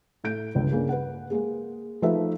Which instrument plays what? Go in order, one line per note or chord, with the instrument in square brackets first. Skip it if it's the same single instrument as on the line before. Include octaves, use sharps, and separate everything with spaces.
[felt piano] A2 A3 G6 D7
G1 C#2
G2 C#3 A#3
B4 F#5
G#3 A#3 G#4
F3 A3 D#4 B4 E5